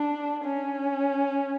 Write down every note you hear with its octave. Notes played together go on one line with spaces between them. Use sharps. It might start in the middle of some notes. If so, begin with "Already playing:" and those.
Already playing: D4
C#4